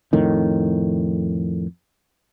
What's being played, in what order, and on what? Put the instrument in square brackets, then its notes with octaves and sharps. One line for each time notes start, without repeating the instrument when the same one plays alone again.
[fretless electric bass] F2 A2 D#3